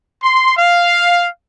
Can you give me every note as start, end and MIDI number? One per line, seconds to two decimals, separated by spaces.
0.22 0.52 84
0.56 1.26 77